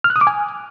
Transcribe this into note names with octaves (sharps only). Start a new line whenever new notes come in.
F6
F#6
D#6
D6
G#5